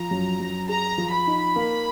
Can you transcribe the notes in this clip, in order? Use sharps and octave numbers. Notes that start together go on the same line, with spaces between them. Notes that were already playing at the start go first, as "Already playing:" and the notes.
Already playing: F3 A#5
F#2
F#2
G#4 A#5
F3
B5
D#4
A#3